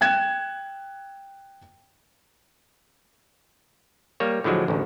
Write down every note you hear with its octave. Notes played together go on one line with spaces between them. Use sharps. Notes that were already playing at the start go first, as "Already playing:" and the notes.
G5 F#6 G#6 E7
G3 A#3 C#5
A2 D3 F3 F#3 G#3
A1 D2